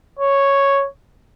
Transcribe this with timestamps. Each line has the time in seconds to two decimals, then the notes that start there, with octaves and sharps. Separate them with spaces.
0.19 C#5